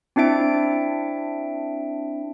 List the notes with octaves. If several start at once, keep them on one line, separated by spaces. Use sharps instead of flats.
C4 D4 E4 E5 D7